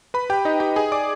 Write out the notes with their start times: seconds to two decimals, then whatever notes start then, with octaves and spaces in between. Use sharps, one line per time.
0.14 B4 B5
0.30 G4 G5
0.45 D#4 D#5
0.60 G4 G5
0.76 G#4 G#5
0.92 D5 D6